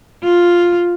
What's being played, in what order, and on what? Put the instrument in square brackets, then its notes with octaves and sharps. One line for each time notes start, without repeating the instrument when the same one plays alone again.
[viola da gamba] F4